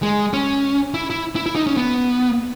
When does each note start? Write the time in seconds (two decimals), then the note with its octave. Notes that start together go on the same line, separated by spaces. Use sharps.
0.02 G#3
0.33 C#4
0.94 E4
1.10 E4
1.35 E4
1.46 E4
1.55 D#4
1.67 C#4
1.77 B3